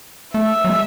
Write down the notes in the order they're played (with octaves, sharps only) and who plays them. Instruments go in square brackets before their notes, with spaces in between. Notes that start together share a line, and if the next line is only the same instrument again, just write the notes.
[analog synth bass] A3 [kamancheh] E5
[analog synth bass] F#3
G#3